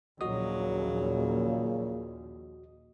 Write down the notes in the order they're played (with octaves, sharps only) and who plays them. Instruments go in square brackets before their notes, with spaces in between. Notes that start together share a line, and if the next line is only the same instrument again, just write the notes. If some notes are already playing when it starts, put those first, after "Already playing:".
[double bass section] A#1 D#2 [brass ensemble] A#2 C#3 [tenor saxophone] F#3 [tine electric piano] F#4 D#5 D#6